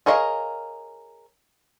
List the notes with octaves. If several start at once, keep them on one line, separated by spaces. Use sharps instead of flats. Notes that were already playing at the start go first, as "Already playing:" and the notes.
G#4 A#4 C#5 D#5 F5